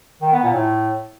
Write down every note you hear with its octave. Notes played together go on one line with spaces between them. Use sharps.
D#3
B3
A#2
A2